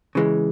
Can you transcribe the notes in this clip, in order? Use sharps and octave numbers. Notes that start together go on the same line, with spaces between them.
C#3 E3 G#3